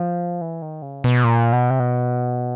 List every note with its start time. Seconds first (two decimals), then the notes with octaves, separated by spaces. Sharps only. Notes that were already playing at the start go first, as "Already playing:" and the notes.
Already playing: F3
0.41 E3
0.62 D#3
0.82 C#3
1.04 B2
1.24 A#2
1.52 B2
1.70 C3
1.80 B2